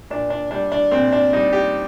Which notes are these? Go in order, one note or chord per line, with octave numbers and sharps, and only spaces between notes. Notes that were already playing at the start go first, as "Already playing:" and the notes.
A#2 D4
D4
G3 D4
D4
A#2 C4
D4
G3 D#4
G4